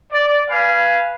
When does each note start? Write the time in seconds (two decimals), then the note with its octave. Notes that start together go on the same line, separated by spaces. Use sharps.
0.11 D5
0.49 B4 F5 G#5